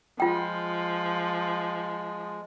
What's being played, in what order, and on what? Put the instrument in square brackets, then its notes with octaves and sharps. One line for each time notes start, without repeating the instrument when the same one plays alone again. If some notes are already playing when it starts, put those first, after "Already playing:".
[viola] F3 [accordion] G#3 [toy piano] F4 G5